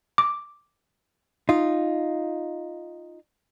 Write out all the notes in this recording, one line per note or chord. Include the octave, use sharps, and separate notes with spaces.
D6
D#4 F4